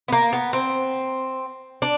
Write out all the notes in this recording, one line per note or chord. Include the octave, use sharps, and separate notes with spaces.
B3
A#3
B3
C4
D4